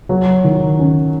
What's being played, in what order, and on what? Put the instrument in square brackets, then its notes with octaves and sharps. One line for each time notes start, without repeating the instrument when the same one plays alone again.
[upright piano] F#3
D#3
C#4